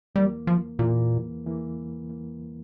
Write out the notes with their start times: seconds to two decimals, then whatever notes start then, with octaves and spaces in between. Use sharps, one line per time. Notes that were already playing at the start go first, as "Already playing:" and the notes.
0.15 E2 E3 G3 A#3
0.47 F3
0.79 E2 A#2 E3 A#3
1.44 E2 E3 A#3
2.09 E3 A#3